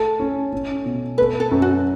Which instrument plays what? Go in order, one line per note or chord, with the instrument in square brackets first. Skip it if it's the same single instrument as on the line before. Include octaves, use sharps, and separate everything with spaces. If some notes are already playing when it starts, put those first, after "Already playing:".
Already playing: [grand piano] A3 [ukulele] A4
[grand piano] C#4
C#4
B2
[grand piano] A3 [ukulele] B4
[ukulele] A4
[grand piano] F#2
[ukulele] F#4